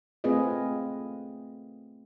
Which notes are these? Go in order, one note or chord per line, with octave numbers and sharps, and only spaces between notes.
A3 C4 F4 G#4 B4 D#5